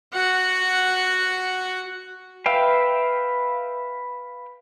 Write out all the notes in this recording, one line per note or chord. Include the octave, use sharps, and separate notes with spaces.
F#4 F#5
B4 E5 F5 G5